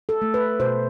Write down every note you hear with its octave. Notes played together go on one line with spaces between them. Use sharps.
A4
A3
B4
B2 C5